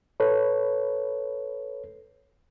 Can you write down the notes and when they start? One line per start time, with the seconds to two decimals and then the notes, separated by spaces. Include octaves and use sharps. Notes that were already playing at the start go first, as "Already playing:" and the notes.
0.20 A4 B4 C#5